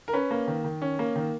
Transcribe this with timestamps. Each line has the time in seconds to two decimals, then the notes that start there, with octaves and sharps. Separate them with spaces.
0.08 A#4
0.13 C#4 B4
0.31 A#3
0.47 D#3
0.64 D#3
0.82 C#4
0.99 A#3
1.16 D#3